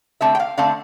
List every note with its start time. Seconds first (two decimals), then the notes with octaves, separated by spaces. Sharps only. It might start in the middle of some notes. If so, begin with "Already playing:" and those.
0.21 D3 A3 C4 E5
0.35 G5
0.40 F5
0.58 D3 A3 C4 F5